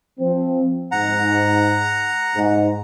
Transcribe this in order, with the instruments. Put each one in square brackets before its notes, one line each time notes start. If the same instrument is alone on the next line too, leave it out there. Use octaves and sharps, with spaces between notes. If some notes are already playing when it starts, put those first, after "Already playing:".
[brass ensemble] F3 C4
[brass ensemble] G#2 [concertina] F#5 A#5
[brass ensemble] G#2